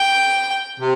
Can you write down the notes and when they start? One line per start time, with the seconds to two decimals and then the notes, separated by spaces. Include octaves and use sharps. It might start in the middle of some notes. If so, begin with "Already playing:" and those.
Already playing: G5
0.80 C3